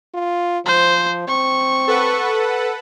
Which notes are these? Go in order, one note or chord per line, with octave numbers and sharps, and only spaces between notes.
F4
F3 C5
C4 C#6
A4 B4 F#5